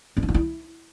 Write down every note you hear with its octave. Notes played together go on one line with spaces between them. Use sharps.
C4
D4
F4
E4